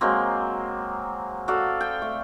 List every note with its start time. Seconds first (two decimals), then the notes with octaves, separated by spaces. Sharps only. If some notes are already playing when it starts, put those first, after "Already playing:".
0.01 F#3 G#3 A#3 C4
1.48 F#4 A4 D5 F5
1.80 G5
2.02 A3